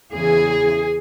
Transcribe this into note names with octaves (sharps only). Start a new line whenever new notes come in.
E2 C#3 E3 G#4